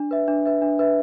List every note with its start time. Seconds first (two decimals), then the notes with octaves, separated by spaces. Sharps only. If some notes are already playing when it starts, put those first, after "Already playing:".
Already playing: D4
0.11 B4 E5
0.28 D4
0.46 B4 E5
0.62 D4
0.79 B4 E5